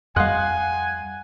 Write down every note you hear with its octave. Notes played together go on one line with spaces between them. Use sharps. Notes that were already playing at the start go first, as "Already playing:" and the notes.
F2 G3 D#5 F5 F#5 G#5 C6 F#6